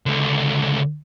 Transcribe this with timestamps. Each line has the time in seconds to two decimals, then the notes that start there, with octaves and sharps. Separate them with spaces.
0.06 C#2 D3